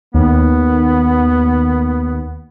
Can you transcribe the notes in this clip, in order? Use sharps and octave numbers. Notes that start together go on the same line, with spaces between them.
D#2 B3